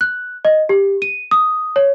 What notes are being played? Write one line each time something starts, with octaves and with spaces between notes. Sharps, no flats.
F#6
D#5
G4
D#7
D#6
C#5